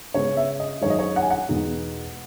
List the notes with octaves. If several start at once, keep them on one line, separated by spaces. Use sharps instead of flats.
C#3 G#3 B3 C#5
E5
D#5
F#2 D#3 G#3 C#5
D#5
C#5
F#5
G#5
F#5
E2 B2 G#3 B3 D#4